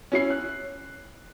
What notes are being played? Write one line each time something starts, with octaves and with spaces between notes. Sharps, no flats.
C#4 E4 C7
F#6